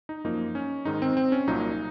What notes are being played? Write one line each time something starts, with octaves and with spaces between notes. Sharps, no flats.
D#4
F#2 F3 A#3 D#4
C#4
G#2 D#3 G#3 D#4
C4
C4
C#4
C2 A#2 F#3 A#3 D#4